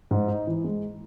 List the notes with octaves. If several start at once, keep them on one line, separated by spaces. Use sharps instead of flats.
G#2
D#4
E3
G#3